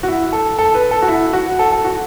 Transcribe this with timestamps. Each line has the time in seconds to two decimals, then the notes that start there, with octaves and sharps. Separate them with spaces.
0.03 F#4
0.08 E4
0.33 A4
0.59 A4
0.74 B4
0.91 A4
1.02 F#4
1.08 E4
1.33 F#4
1.59 A4
1.72 A4
1.85 F#4